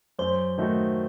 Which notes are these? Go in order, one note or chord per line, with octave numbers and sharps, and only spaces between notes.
F#2 C5
D#3 A3 D#4 F#4